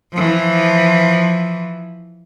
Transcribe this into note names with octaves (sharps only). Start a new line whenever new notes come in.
E3 F3